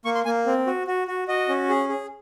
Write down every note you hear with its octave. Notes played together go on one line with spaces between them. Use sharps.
A#3 C#6
C6
A#3 G#5
C4
F#4
F#4
F#4
F#4 D#5
C#4
G#4
G#4